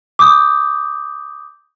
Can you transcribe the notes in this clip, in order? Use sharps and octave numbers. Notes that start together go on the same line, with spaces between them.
D6 D#6 G6